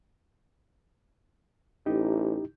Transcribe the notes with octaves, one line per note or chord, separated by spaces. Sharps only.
A1 D#4 E4 G4